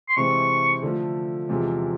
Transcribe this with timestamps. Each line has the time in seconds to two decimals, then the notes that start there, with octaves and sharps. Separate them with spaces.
0.09 C6
0.17 C3 E3 G#3 C4 C#6
0.83 D3 F3 A3
1.49 E2 C3 F3 G#3